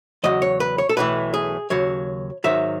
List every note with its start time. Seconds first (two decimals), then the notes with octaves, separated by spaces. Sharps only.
0.24 E2 C#3 F#3 D#5
0.42 C#5
0.60 B4
0.78 C#5
0.89 A4
0.97 B1 A2 E3 B4
1.34 G#4
1.70 D#2 C#3 F#3 C#5
2.44 G#2 D#3 F#3 E5